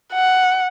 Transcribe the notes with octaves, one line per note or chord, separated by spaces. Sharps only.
F#5